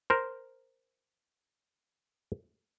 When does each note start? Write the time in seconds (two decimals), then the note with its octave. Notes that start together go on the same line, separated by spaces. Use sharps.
0.10 A#4 C5